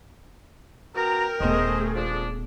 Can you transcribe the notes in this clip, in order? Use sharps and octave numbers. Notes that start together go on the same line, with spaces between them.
B2 A#4 G5 A#5
D#1 D#3 A3 B3 G#4 C5 D#5
F3 D4